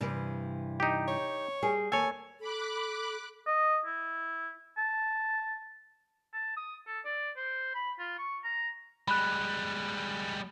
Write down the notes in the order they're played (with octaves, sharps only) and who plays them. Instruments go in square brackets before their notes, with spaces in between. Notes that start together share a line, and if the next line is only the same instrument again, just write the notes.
[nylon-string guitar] G2 C3 E3
[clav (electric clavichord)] D#4 G4
[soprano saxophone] C#5
[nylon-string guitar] G3 G#4
[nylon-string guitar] D#2 [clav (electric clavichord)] A4 C#5 [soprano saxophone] G#5
[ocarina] A4 [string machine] B5 D6 F#6
[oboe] D#5
E4
A5
A5
D#6
A4
D5
C5
B5
F4
C#6
A#5
[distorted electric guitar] G3 G#3 [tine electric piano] B5 F#6